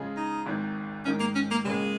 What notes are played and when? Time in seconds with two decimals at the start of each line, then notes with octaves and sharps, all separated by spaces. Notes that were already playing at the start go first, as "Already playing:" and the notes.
Already playing: C#3 F3 G#3 F4 G#4
0.17 D#4
0.46 G#1 G#2 D#3 G#3
1.05 G#2 D#3 G#3 C#4 D#4 A#4
1.20 A#3
1.35 C#4
1.51 A#3
1.65 C#2 C#3 G#3 A#3